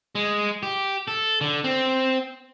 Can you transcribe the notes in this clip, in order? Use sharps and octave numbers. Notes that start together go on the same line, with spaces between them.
G#3
G4
A4
D3
C4